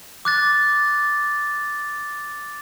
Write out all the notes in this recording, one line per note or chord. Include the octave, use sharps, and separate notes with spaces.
D6 F#6 A6